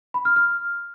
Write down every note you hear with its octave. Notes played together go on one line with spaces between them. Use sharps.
B5
F6
F6